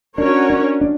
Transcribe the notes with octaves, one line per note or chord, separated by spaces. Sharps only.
C#4 D4 F#4 A#4 C#5
D4
D4